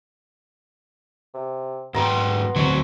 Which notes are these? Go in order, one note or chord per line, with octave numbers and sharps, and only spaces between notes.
C3
G#2 F#3 B3 G5 A#5 C6
D2 F#3 C4 C#6